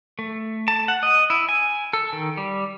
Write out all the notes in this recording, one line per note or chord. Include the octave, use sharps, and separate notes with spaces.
A3
A5
F#5
D#5
E4
G#5
A4
D#3
G3